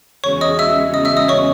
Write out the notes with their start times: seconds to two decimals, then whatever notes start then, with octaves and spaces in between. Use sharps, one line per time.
0.23 E2 C#3 G#3 C#4 F#4 C#5 C#6
0.41 D#5 D#6
0.59 E5 E6
0.94 D#5 D#6
1.05 E5 E6
1.17 D#5 D#6
1.28 C#5 C#6